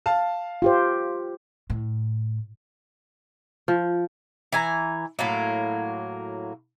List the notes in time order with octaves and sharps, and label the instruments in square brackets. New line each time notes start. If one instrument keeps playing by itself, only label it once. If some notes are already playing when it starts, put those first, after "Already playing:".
[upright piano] F5 A5
[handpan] F4 G4 C5
[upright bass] A2
[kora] F3
[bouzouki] E3 G#5 A#5
A2 F#3 A#3